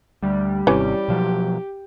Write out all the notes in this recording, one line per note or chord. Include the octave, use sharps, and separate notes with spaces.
D2 G3
G#1 C3 E3 C#4 G4
B2 F3 F#3